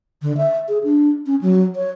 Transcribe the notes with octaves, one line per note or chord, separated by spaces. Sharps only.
D3
E5
G#4
D4
C#4
F#3
C#5